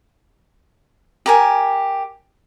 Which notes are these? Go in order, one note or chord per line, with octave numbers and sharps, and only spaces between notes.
G4 A#4 G#5